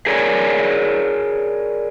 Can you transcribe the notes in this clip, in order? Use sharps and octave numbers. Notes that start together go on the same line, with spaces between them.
G#4 A#4 C#5 D5 F5 G#5